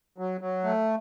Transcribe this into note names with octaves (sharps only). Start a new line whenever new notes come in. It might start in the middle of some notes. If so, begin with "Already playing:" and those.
F#3
F#3
A3